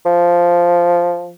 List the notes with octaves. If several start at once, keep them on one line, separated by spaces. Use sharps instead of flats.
F3